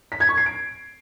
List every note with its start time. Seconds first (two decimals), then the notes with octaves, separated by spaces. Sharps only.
0.12 B6
0.20 G#6
0.29 C#6
0.37 C7
0.46 D7